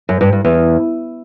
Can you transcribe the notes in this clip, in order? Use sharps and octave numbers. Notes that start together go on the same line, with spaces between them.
F#2
G2
G2
E2